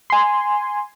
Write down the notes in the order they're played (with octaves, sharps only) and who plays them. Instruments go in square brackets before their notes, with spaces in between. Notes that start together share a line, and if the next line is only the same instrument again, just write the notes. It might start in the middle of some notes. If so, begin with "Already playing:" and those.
[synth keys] G#5 C6